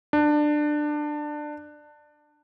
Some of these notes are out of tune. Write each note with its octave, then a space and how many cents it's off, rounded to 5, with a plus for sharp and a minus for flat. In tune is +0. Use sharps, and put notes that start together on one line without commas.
D4 +20